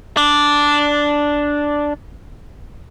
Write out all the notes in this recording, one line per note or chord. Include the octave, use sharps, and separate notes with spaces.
D4 D5